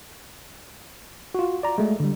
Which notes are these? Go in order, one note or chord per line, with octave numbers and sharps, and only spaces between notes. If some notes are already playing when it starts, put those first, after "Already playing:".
F4 F#4
D5 A#5
G#3 A3
D3 G3